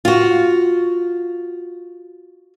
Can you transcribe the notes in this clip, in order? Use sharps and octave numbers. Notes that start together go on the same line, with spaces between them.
F4 F#4